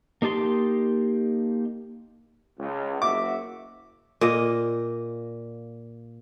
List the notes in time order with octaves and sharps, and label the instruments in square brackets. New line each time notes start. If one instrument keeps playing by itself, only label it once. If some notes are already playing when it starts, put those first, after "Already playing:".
[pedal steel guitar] A#3 D#4 G4 A5 C6
[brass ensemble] C#2
[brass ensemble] F#1 F#4 E5 [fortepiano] D6
[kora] A#2 A#3 D#5